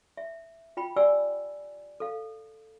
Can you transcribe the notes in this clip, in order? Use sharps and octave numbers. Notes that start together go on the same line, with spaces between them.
E5
F4 G5 B5
G4 D5 F#5 G#5 E6
A4 F5